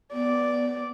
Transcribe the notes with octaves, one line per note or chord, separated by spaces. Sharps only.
B3 D5